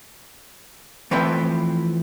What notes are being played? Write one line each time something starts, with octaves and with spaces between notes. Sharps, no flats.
E3 F3 A3 C4 B4 G5